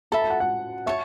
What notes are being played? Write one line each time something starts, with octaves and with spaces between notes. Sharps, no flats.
A4 E5 A5 B5
A5
F#5
F#5
C#5 E5 A5 C#6